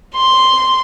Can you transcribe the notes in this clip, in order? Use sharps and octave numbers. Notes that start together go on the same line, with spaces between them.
C6